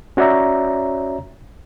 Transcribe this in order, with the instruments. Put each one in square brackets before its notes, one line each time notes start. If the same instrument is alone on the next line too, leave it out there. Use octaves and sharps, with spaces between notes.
[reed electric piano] C#4 F#4 C#5 D5 E5 A#5